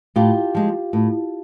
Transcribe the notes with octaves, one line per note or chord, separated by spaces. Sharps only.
A2 F4 G4
F3 G#3
A2